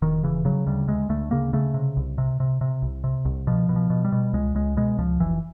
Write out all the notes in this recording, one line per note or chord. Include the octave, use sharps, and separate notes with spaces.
E1 D#3
C#3 E3
C#3 F#3
D2 G3
D2 G#3
D2 A3
C#3 A#3
C#3 A3
C3
C2
C3
C3
C3
C2
C3
C2
B2 F3
B2
F3
B2
G3
B2
C#2 G#3
C#2 G#3
B2 G#3
C#2 F3
F1 E3